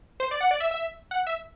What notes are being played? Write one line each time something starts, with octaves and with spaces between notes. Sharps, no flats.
C5
D5
F#5
D5
E5
E5
F#5
E5